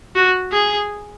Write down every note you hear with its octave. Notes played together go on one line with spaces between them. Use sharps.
F#4
G#4